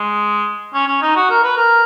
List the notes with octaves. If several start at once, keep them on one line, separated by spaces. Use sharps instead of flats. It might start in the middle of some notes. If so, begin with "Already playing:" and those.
Already playing: G#3
C#4
C#4
D#4
F#4
A#4
B4
A#4